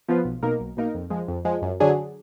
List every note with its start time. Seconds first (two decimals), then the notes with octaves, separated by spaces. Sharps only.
0.08 F3 B3 F4 B4
0.25 B1
0.43 B2 A#3 D#4 A#4
0.59 B1
0.77 B2 A#3 D#4 A#4
0.94 F2
1.10 F3 G#3
1.28 F2
1.45 F3 G#3
1.62 F#2
1.80 D3 F#3 D4 G#4